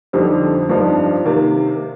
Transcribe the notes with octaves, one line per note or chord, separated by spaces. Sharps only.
F2 D3 G3 C4 D#4
G2 F3 C4 D#4
C3 D#3 A#3